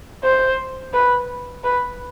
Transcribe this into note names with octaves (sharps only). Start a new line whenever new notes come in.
C5
B4
B4